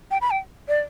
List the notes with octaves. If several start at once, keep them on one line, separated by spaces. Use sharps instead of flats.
G5
B5
G5
D5